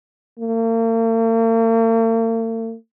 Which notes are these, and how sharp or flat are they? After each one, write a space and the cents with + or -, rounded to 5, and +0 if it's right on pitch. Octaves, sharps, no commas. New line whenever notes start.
A#3 -45